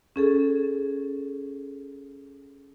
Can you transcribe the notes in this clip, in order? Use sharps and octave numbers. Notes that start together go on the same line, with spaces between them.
C#4 G#4 A4